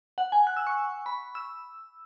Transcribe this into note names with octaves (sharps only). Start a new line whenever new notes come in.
F#5
G#5
F#6
E6
C#6
B5
E6